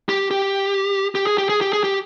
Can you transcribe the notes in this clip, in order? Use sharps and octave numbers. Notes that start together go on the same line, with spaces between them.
G4
G4
G4
G#4
G4
G#4
G4
G#4
G4